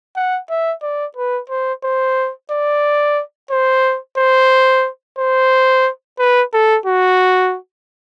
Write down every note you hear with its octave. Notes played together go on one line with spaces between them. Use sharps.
F#5
E5
D5
B4
C5
C5
D5
C5
C5
C5
B4
A4
F#4